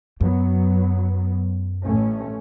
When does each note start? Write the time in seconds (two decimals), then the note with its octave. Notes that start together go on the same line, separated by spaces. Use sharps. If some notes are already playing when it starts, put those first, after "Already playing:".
0.21 F#2 F#3 B3
1.84 A1 A3 C#4